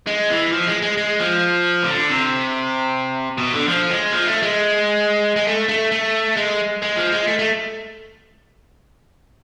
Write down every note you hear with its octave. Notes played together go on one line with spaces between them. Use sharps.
G#3
E3
F3
G#3
G#3
G#3
F3
C3
D3
C3
B2
D3
F3
G#3
F3
A3
G#3
G#3
A3
A3
A3
G#3
G#3
F3
G#3
A3
A3